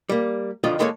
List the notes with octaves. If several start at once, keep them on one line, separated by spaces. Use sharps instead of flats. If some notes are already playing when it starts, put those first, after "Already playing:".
G3 A#3
F2 D3 D#3 F3 F4 D#5
E3 G#3 A#3 A4 A#4 C#5